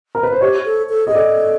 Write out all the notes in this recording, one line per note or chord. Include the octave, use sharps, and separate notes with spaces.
A#4
B4
C5
G4 C#5
A4
A4
G#4 D#5
A4 D5